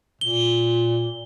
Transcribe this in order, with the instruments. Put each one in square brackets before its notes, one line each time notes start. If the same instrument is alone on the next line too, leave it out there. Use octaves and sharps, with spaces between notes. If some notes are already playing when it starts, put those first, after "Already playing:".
[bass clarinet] A#2 [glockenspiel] G7